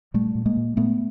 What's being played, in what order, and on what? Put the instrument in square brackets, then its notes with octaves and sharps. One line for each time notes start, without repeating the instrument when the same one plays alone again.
[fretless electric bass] A#2 G3 A3
A#2
G#3 A#3
A#2
A#2 A3 B3